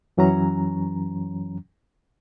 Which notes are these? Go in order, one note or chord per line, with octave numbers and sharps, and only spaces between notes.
F#2 E3 F#3 C#4 A#5